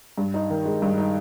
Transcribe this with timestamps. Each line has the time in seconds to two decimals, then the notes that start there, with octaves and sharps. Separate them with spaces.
0.18 G2
0.34 D#4
0.50 D#3
0.65 G#3
0.82 G2
0.98 D#4